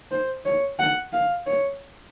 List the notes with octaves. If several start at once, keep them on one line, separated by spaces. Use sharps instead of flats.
C5
C#5
F#5
F5
C#5